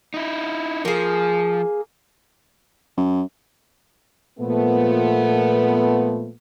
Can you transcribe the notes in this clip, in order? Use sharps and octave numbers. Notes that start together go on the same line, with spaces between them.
D#4 E4
F3 A#3 G#4
F#2
A#2 F3 A3 B3